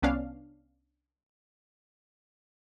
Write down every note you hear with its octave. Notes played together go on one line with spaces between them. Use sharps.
C2 B3 C#4 D4 F5